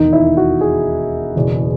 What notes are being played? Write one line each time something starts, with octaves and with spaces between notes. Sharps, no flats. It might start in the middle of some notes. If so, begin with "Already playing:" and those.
Already playing: E1 D#2 D#3 D#4
E4
F#4
G#4
F#1 E2 B2